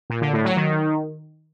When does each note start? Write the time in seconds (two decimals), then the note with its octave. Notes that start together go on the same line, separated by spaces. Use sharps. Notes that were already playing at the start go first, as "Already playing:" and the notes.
0.10 A#2
0.21 D3
0.33 A2
0.45 F#3
0.56 D#3